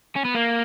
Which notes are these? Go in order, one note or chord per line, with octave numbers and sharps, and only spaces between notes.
C#4
B3
A#3